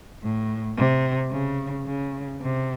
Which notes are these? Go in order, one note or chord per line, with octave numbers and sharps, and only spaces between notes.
A2
C3
C#3
C#3
C3